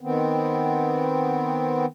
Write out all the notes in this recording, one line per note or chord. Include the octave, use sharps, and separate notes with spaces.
D#3 B3 C4